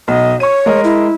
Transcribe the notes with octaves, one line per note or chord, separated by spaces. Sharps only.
B1 D#5
C#5 C#6 D#7
G#3 A#4 D#5
E4